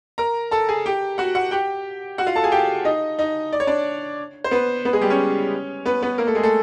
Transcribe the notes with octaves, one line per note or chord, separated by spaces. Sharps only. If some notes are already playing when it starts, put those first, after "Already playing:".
A#4 A#5
A4 A5
G#4 G#5
G4 G5
F#4 F#5
F#4 F#5
G4 G5
F#4 F#5
F4 F5
A4 A5
G#4 G#5
G4 G5
D#4 D#5
D#4 D#5
D5
C#5
D4 D5
C5
B3 B4
B3 B4
G#3 G#4
G3 G4
C#4 C#5
B3 B4
B3 B4
A#3 A#4
A3 A4
G#3 G#4
A3 A4